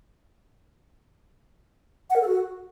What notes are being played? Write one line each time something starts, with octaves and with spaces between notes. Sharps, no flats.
F#5
A#4
A4
F#4